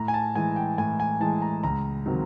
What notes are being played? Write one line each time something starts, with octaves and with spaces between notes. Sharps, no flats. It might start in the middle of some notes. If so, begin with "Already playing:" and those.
Already playing: A2 A#5
G#5
A5
E3 G#3 G#5
G5
A2 G#5
G#5
E3 G#3 A5
A#5
C#2 A#5
C3 D#3 F#3